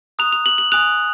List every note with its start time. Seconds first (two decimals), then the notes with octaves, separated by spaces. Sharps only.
0.19 A#5 D#6 F#6 F7
0.32 F7
0.46 F#7
0.58 F#7
0.72 G#5 D#6 F#6 F7